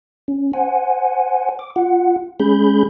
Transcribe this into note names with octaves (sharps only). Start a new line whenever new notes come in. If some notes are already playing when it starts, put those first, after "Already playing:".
C#4
C5 F#5 G#5
D6
F4 F#5
G#3 C#4 G#4 B5 G6